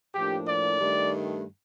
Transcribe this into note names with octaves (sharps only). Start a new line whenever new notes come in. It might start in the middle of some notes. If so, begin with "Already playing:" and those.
A2 F3 A#3 D4 G4
D5
G2 D#3 A3